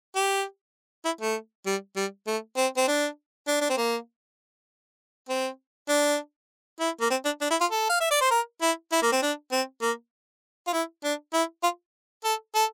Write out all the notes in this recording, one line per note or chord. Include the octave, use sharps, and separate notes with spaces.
G4
E4
A3
G3
G3
A3
C4
C4
D4
D4
D4
C4
A#3
C4
D4
E4
A#3
C4
D4
D4
E4
F4
A4
F5
E5
D5
C5
A#4
E4
E4
A#3
C4
D4
C4
A#3
F4
E4
D4
E4
F4
A4
A4